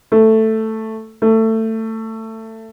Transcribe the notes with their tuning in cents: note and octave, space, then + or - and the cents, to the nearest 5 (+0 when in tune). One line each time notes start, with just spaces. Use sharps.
A3 +5
A3 +20